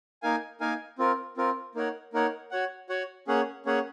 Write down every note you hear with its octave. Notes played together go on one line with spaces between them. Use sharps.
A#3 D#4 A#4 F5 G#5
A#3 D#4 A#4 F5 G#5
C4 F4 A#4
C4 F4 A#4
A#3 D#4 A#4 C#5 F#5
A#3 D#4 A#4 C#5 F#5
F#4 C#5 F#5
F#4 C#5 F#5
A#3 C#4 G#4 C#5 F#5
A#3 C#4 G#4 C#5 F#5